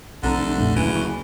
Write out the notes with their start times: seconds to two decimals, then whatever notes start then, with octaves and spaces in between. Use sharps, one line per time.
0.23 F1 B1 D3 A4 A#5
0.58 F2 A#2 A3
0.76 F#1 D2 E3
0.96 B5 C#6